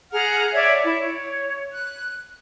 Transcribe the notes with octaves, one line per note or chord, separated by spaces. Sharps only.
G#4 F#5 A#5 F6
C#5 D5 E5 G#6
E4
C#5
F#6